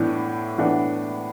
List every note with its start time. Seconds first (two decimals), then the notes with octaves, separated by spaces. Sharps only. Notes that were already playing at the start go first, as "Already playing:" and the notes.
Already playing: A2 E3 B3 D4
0.58 A2 E3 B3 D4